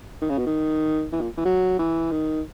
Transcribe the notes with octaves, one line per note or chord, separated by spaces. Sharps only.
D#3
C#3
B2
D#3
E3
A#2
E3
F#3
E3
D#3